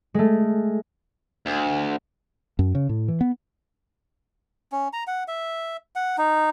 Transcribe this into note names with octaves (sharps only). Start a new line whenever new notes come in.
G#3 A3
D2
F#2
C#3
A2
E3
B3
C#4
A#5
F#5
E5
F#5
D#4